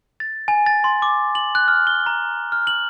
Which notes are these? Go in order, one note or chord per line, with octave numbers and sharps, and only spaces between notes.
A6
G#5
A6
C6
D6
F#7
F#6
F6
G7
A#5
F6
F#7